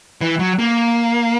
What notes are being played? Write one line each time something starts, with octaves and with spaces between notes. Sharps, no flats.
E3
F#3
A#3